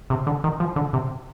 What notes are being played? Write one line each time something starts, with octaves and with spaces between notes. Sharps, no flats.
C3
D3
D#3
F3
D3
C3